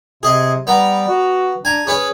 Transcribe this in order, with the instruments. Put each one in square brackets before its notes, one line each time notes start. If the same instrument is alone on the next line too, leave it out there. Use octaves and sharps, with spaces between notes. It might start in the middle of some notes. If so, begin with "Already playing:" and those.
[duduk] C3 [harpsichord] G#4 D#5
[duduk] G3 [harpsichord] B3 A#5
[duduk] F#4
[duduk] D4 [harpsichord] G#5 A#5
[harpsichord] C#4 B4 C#5 [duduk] G#4